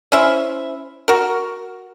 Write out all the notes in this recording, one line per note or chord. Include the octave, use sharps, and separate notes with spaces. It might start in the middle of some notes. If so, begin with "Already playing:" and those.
C#4 E4 C5 E5
F#4 A#4